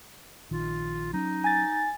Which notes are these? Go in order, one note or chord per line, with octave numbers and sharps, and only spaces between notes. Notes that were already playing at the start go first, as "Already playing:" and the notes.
A#1 D#3 F4
F#3 C#4 D#4
G#5 A6